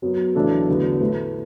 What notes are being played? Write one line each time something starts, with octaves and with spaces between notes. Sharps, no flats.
F#2 F#3 B3
B1 A2 E3 D4 A4
E2 D3 F#3 B3
A2 A3 E4 B4